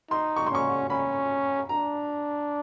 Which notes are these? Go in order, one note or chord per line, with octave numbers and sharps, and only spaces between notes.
D#4 C6
C#6
C6
C#4 C#6
C#4 B5
D4 A#5